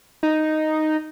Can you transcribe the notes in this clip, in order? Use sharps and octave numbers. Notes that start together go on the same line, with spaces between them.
D#4